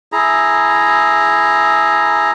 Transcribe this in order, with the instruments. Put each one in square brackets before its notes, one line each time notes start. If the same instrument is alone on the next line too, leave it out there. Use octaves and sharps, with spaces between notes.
[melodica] E4 G#4 A#5